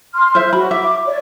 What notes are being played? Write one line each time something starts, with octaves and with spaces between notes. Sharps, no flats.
C6 F6
C5 E5
F#4 C#5 B5
E5 D6
C#5 D5